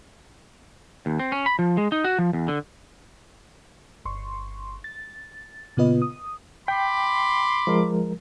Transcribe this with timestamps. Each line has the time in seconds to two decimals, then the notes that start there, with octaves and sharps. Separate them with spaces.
1.06 D#2
1.19 C4
1.32 C#4
1.46 B5
1.59 F3
1.77 G#3
1.92 D#4
2.04 F#4
2.19 F3
2.33 E2
2.48 D3
4.05 G1 C6 C#6
4.84 A6
5.77 A#2 C#3 B3 F4 B4 D#5
6.02 D#6
6.68 G5 B5 C6 D6
7.67 F3 G#3 A#4